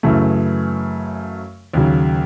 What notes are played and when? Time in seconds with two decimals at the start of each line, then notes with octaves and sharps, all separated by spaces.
0.03 F#2 C#3 E3 A3
1.74 D#2 C#3 F#3